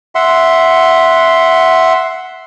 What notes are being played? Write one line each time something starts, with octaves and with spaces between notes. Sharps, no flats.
E5 F#5 C6